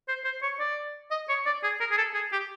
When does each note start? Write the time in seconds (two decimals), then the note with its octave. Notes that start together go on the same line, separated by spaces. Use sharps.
0.08 C5
0.24 C5
0.43 C#5
0.60 D5
1.11 D#5
1.29 C#5
1.46 D5
1.63 G#4
1.80 A#4
1.91 G#4
1.97 A4
2.14 G#4
2.33 G4